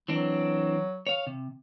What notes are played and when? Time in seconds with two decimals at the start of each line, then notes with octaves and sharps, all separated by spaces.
0.08 E3 F#3 C4 D4
1.07 C#5 F5
1.27 C3